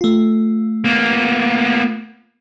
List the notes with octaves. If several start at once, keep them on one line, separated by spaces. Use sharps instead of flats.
A3 F4
A#3 B3